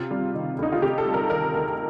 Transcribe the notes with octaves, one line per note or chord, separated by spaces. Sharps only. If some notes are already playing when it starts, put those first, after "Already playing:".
Already playing: C3 F4
G3
D#3
D2 D#4
F4
C3 G4
A4
G3
A#4
D#3 A#4
D2